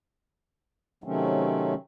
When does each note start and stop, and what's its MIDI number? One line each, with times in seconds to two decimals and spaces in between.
1.04 1.74 48
1.04 1.74 51
1.04 1.74 54
1.04 1.74 57
1.04 1.74 60
1.04 1.74 61